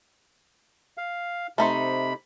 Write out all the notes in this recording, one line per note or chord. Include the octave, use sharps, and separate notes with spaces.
F5
C3 A3 D#4 C5 B5